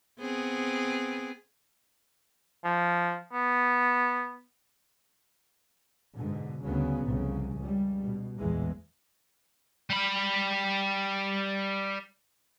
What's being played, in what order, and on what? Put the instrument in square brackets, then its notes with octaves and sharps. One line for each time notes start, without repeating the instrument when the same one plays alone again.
[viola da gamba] B3 C4 G#4
[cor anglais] F3
B3
[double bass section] G#2 B2 D3
D2 G2 C#3 F#3 B3
C2 F2 C#3
C#2 G3
B2
A#1 E2 A2 E3 G#3
[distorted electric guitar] G3 B5